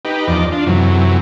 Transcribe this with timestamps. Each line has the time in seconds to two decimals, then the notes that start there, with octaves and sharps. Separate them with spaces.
0.05 D#4 G4 B4
0.27 E2 F3 D#4 D5
0.52 D4 F4
0.66 F#2 C3 E3 F#3